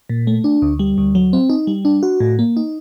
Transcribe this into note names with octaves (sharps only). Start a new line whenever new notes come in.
A#2
A3
D4
D2
G3
D2
F#3
C4
D#4
G3
D4
F#4
A2
A#3
D#4